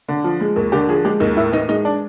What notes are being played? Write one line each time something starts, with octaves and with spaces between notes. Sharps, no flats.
D3
F3
G#3
D#2
D3 G4
F3 G#4
G#3 G4
D#2 D#4
A2 E4
E3 D#4
G#3 D#4
D4